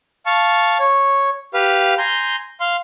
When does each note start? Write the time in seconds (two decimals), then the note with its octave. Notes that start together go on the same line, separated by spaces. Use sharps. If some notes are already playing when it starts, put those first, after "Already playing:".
0.26 F5 A5 C#6
0.79 C#5
1.54 G4 B4 F5
1.98 G#5 A#5 C6 G6
2.60 F5 C6